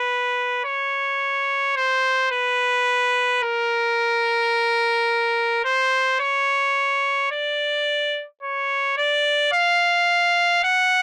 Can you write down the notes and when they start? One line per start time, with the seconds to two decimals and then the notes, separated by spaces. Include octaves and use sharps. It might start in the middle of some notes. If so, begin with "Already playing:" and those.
Already playing: B4
0.65 C#5
1.76 C5
2.32 B4
3.43 A#4
5.65 C5
6.20 C#5
7.32 D5
8.43 C#5
8.98 D5
9.53 F5
10.64 F#5